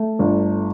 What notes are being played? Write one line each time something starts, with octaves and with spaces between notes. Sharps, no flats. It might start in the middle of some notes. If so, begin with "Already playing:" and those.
Already playing: A3
G1